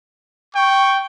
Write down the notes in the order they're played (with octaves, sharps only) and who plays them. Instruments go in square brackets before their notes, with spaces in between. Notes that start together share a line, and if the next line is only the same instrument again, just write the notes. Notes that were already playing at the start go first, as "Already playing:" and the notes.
[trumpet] G5 [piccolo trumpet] C#6